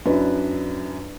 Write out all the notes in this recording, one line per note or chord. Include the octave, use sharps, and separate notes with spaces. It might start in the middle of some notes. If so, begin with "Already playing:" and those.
F#2 D4 E4 B4